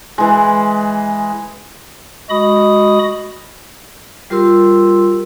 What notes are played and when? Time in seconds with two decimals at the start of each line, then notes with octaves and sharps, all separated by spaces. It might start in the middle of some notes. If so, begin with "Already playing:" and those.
0.18 E3 G#3
2.30 G#3 F#4 D#5 B5 D#6
4.30 G3 F4 G4 A#4 C6 E6